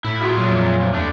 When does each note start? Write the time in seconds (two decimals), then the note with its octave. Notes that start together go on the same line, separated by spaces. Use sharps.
0.05 A2 E4
0.21 F4 F#4 G#4 E5
0.37 A#2 F#3
0.51 F2
0.80 A2 C3
0.93 D#2 D3 A3 D4